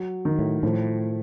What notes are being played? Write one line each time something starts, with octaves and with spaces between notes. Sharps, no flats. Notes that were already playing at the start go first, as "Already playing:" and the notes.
Already playing: F#3
D#3
A2
A2 F3